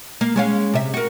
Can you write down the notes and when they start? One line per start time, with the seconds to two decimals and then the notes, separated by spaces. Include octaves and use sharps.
0.21 A#3
0.36 G#3 C#4 F5
0.73 C3 E5
0.94 F#4 A#4